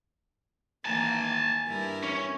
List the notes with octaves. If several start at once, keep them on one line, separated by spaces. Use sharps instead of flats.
D#3 E3 A#3 G#5 A5
G2 E4 A#4
C#4